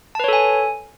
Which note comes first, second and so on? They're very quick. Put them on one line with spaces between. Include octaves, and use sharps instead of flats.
A5 B4 C#5 A4 G#5